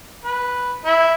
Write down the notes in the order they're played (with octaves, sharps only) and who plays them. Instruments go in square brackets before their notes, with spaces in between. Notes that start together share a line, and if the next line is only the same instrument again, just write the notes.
[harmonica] B4
E4